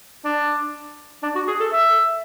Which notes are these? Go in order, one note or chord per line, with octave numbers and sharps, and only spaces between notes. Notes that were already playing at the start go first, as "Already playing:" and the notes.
D4
D4
F#4
G#4
A4
E5